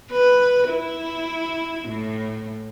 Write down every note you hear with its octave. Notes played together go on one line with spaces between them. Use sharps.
B4
E4
A2